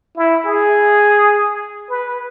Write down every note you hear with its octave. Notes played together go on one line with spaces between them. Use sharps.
E4
G#4
B4